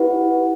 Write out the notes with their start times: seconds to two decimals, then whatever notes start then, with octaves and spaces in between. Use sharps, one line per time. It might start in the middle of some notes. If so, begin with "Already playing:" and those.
Already playing: E4 G4 B4 F#5